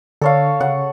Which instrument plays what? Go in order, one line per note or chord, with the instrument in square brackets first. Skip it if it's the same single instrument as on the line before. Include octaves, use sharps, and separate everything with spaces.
[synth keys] D3 [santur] A4 C#5 F5
[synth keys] C#3 [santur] F#5